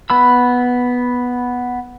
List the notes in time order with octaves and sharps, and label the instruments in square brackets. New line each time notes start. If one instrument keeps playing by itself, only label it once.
[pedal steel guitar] B3 B5 E6